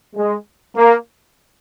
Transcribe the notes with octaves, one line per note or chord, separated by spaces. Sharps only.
G#3
A#3